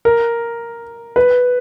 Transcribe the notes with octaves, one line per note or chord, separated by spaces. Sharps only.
A#4
B4